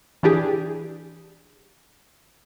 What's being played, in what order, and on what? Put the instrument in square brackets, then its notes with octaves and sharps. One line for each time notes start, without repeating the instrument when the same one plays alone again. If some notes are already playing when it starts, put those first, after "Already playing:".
[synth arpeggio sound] E3 D4 G4 G#4